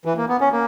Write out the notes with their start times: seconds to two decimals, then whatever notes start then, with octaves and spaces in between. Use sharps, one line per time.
0.05 E3
0.17 A#3
0.29 B3
0.41 C#4
0.52 A#3